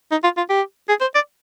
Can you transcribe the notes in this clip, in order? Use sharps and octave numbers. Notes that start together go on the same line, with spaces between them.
D#4
F4
F4
G4
G#4
C5
D5